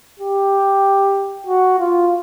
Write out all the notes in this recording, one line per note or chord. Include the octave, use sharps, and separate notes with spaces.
G4
F#4
F4